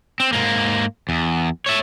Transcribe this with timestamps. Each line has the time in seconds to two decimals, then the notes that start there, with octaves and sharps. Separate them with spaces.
0.20 C4
0.33 G#2 A#3
1.09 E2
1.66 C#5 E5